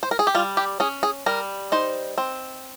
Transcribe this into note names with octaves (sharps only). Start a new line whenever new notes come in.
C5
A#4
G#4
G4
G3 F4
G4
C#4 G#4
G#4
G3 A#4
D#4 C5
C4